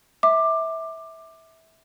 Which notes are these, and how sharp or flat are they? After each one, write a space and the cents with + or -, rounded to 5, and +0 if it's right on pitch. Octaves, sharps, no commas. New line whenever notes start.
E5 -20 D6 +15